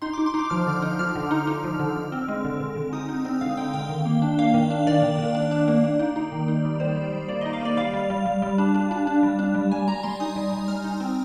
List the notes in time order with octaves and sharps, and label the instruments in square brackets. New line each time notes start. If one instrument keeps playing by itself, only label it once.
[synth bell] D#4 C6
D6
D#4
C6
D#4 D6
F3 F6
D3
D#4
F3 F6
D3
D#4
D#4
F3
D3
D3
C4
G#3
D3
D3
D3
D#4 D#6
D#4
C4
D3 F5
D#4 G5
D3 G5
D#3
A#3
D4
A#3 F5
D#3
D4
D#3 D5
D#3
D#3
D4
D4
A#3
A#3
D#4
D#4
D#3
D#4
G3
D#3 C5
G3
G3
A#3 D5
D#5
D#4
F5
A#3 D5
G3 F5
G3
G3
G3
G3
D4
D4
D4
D4
G3
D4
G3
G3 G#5
G3 A#5
G3 C6
D#4 D#6
G3
G3
G3 F6
D#4
C4